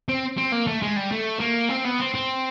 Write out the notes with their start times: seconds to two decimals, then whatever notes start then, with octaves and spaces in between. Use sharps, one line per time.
0.09 C4
0.38 C4
0.52 A#3
0.67 A3
0.82 G#3
0.96 G3
1.12 A3
1.40 A#3
1.70 C4
1.84 B3
2.00 C4
2.14 C4